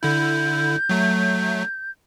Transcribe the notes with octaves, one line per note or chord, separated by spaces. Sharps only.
D3 E4 G6
F#3 A3